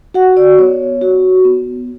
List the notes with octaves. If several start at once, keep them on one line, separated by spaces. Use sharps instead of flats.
F#4 F#5
D5
B3 C#5
F#4
B3